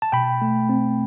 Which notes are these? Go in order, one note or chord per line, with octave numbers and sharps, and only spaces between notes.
A5
B2 G5 B5
A3
C4